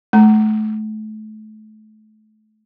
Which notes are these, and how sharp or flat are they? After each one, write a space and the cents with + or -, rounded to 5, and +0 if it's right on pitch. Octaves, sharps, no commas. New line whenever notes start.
A3 -30 A#5 +0